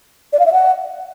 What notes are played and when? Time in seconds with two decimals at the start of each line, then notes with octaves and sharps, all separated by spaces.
0.33 D5
0.39 F5
0.46 E5
0.53 F#5